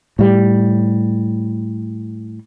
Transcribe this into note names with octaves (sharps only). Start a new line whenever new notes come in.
A2 G3